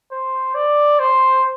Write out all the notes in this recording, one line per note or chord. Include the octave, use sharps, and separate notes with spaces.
C5
D5
C5